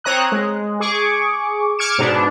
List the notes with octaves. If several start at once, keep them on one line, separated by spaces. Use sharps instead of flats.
C4 C#5 A#5 D#6 F#6
G#3
G#4 C#6 D6
D6 F6 G#6 C#7 D7 E7
G#2 B2 B3 D4